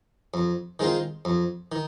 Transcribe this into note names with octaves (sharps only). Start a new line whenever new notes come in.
F2
D#3 G#3 C4 F4
F2
D#3